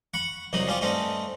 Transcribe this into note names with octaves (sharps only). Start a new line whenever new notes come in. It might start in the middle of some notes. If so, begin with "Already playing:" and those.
F#5 B5 C#6
C2 C3 F#3 D#4
G3 C#4 F4 G4
G2 A3 C4 C#4 D#4